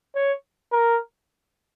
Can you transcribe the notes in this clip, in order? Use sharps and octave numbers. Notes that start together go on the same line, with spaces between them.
C#5
A#4